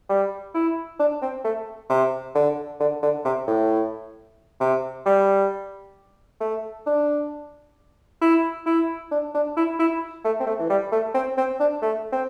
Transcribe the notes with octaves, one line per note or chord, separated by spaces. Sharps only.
G3
E4
D4
C4
A3
C3
D3
D3
D3
C3
A2
C3
G3
A3
D4
E4
E4
D4
D4
E4
E4
A3
C4
A3
E3
G3
A3
C4
C4
D4
A3
C4